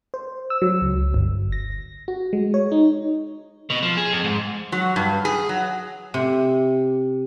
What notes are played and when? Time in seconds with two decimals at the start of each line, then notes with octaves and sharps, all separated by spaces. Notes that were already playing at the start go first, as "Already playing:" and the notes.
0.14 C5
0.50 E6
0.62 F#3
0.81 C#2
1.14 G1
1.52 A#6
2.08 F#4
2.33 G#3
2.54 C#5
2.72 D#4
3.70 B2
3.82 F3
3.97 G#4
4.12 F2
4.24 G#2
4.72 F#3
4.96 G2
5.25 G#4
5.49 F#3
6.14 C3